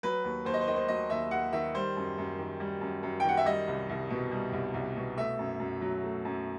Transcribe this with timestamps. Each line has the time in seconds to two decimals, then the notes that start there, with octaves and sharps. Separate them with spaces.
0.03 F#3 B4
0.24 D#2
0.45 D#2 C5
0.54 D#5
0.61 C5
0.67 D#3 D#5
0.76 C5
0.88 F#3 D#5
1.10 D#2 E5
1.31 D#2 F#5
1.53 D#3 E5
1.75 G3 C5
1.96 F#2
2.18 F#2
2.38 D#3
2.60 G3
2.81 F#2
3.03 F#2
3.20 G5
3.24 D#3 F#5
3.37 E5
3.46 G3 D#5
3.68 C2
3.89 C2
4.10 B2
4.31 G3
4.52 C2
4.74 C2
4.96 B2
5.17 A3 E5
5.39 F#2
5.60 F#2
5.81 F#3
6.03 A3
6.25 F#2